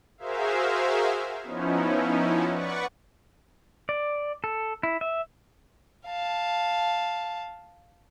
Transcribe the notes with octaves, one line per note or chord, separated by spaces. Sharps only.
F#4 G#4 A#4 C5 E5 F5
F3 B3 C#4 D#4 E4
B4 D5 F#5 C#6
D5
A4
E4
E5
F5 A5